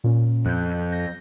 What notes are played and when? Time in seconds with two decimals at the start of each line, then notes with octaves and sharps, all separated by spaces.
0.04 A#2 C#4
0.46 F2 F#6 G6
0.92 G6 A#6